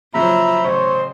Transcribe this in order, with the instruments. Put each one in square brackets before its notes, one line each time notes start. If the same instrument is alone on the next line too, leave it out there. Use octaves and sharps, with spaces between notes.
[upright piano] D#2 C#3 F3 [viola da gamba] F#3 C5 [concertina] E5 A#5 B5
[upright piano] A1 [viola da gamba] C#3 [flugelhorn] C5 [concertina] C#5